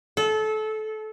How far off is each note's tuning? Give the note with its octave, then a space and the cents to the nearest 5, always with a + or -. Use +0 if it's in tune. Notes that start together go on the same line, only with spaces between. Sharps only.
A4 -25